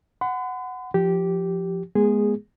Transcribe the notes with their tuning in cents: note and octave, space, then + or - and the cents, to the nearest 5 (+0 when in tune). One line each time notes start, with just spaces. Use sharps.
F#5 +0 B5 +45
F3 -5 G4 -10
G#3 +10 B3 -35 G#4 -10